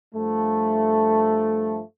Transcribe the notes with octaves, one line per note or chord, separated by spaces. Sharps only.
G2 F3 A3